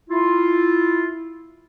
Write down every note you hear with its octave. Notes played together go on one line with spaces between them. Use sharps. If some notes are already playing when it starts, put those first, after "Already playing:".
E4 F4